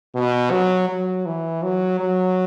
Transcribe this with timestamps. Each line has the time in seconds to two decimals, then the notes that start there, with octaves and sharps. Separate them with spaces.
0.15 B2
0.51 F#3
0.89 F#3
1.26 E3
1.63 F#3
2.00 F#3